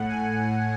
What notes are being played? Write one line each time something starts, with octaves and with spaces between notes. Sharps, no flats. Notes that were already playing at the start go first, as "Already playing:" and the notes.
Already playing: A2 F#5
G#5